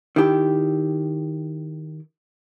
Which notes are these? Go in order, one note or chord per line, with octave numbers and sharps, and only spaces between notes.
D#3 E4 G4